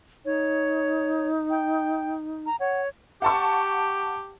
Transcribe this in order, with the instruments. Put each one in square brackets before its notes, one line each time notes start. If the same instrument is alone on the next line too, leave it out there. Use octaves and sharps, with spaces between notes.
[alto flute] D#4 [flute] C#5
[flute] G5
A#5
[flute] C#5 [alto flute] F#5
[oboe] G4 [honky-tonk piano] F#5 A5 C#6